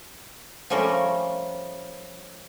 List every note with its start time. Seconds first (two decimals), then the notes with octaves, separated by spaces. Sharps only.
0.70 F3 G3 A3 C#4 A4 A#4